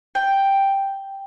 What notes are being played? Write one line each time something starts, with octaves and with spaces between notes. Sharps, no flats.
G5